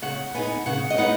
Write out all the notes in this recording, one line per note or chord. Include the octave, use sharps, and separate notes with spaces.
C#3 F#5
B3 D#4 G#5
C#3 F#5
D#5
B3 D#4 F#5